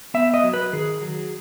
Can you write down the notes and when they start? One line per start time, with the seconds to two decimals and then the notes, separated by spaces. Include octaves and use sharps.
0.14 B3 E5
0.34 D#5
0.44 F#3
0.54 B4
0.73 D#3 G#4
1.02 F#3